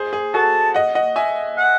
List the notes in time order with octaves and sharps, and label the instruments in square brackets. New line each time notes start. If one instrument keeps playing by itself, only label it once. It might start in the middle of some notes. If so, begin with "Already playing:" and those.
Already playing: [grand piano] G#4 C5
G#4
[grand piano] F#4 A4 [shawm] A5
[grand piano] D#5 F#5
D#5 F#5
E5 G#5
[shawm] F#5